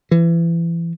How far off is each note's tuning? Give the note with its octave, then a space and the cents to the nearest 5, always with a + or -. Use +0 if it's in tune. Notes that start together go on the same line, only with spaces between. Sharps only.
E3 +30